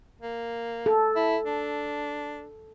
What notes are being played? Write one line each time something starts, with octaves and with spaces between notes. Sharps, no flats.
A#3
A4
E4
D4